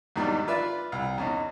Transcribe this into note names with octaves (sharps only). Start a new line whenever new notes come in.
E2 G#2 D#3 F#3 G3 D4
F4 B4 D5 E5
C2
E2 C#4 D#4